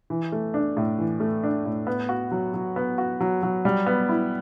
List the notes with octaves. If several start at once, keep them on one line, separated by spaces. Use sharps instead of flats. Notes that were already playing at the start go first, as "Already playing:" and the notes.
E3
A3
D4
A2
E3
A3
D4
A2
B3
F#4
F#3
F#3
B3
F#4
F#3
F#3
G3
B3
E4